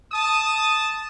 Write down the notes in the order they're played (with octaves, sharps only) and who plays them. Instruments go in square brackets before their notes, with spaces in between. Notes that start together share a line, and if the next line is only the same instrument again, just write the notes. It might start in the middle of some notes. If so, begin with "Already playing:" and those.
[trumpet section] A5 D#6